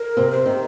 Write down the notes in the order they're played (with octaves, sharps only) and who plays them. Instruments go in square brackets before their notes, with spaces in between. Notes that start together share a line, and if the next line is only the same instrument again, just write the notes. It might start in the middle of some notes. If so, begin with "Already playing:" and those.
Already playing: [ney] A#4
[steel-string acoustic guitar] C3
[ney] C5
[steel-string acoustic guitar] D#3